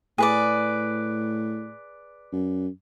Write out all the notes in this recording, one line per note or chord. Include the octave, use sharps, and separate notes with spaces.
A2 G#4 B4 D5
F#2